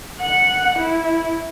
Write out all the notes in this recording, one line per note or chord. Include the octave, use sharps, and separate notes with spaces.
F#5
E4